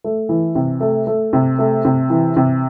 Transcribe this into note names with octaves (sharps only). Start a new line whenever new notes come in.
A3
E3
C3
A3
A3
C3
A3
C3
E3
C3